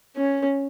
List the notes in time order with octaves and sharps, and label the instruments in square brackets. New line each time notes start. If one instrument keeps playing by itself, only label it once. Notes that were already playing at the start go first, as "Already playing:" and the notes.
[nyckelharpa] C#4